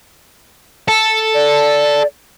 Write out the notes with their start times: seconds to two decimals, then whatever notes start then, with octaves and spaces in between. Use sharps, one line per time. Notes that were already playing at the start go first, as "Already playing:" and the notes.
0.88 A4
1.34 D5